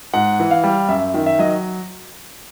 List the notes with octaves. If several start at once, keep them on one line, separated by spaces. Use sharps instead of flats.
G#2 F#5
E3
F5
G3
F#2 E5
D#3
E5
F#3 D#5